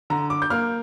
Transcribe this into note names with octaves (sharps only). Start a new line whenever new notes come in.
D3 A#5
D6
G6
A#3 F6